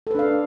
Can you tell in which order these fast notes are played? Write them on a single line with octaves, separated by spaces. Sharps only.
A4 B4 D4 F5